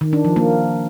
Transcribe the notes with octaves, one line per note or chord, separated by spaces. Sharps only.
D#3
D4
F3
A#3